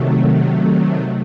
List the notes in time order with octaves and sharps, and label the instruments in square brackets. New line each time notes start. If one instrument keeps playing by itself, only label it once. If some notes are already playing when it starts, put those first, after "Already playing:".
Already playing: [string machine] C3 D#3 F#3 A3